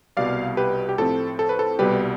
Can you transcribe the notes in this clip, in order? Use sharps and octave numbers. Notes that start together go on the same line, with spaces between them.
C2 B2 G3 D5 F5
G4 B4
G4
A2 F3 C4 A4
A4
B4
A4
C2 B2 G3 G4 B4